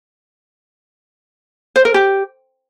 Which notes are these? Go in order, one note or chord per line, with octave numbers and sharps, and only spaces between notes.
C5
A#4
G4